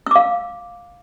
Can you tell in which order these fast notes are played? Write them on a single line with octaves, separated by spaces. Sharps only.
E6 D6 F5